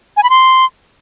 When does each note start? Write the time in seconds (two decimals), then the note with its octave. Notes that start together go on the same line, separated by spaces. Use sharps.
0.17 G#5
0.23 B5
0.30 C6